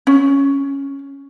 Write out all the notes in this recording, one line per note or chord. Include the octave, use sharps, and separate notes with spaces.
C#4